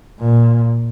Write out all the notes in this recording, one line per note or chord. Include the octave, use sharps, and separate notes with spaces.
A#2